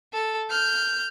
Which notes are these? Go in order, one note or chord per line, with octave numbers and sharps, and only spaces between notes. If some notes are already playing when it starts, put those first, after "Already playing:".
A4
F6 G6